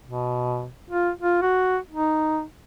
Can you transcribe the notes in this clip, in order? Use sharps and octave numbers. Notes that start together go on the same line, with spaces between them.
B2
F4
F4
F#4
D#4